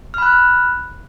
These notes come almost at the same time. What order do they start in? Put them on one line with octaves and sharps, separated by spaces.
F6 B5 F#6